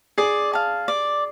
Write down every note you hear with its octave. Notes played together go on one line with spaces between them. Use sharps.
G#4 D5
F5 A5
D5